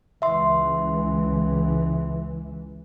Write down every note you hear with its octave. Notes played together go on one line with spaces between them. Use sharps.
C#2 E3 E5 C6